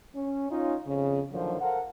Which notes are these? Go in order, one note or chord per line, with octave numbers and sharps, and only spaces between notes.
C#4
C#4 D#4 F4
F2 C#3
F#2 A#2 D3 D#3 F3 F#3
A4 A#4 C5 F5 F#5